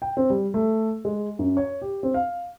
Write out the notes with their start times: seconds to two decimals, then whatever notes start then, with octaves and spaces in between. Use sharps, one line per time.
0.02 G5
0.17 C4
0.30 G3
0.54 A3
1.05 G#3
1.39 F#2
1.57 C#5
1.82 G4
2.03 C4
2.14 F5